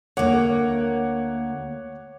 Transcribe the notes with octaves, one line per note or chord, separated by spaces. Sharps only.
D2 A#3 C#5 F#5 D6